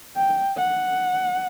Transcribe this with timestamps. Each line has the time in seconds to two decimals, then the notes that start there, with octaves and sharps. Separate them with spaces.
0.16 G5
0.57 F#5